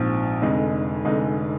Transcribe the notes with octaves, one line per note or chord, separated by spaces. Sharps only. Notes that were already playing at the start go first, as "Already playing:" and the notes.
Already playing: A#1 G#2 F3 C4
F1 F2 D3 G#3 D#4
F1 F2 D3 G#3 D#4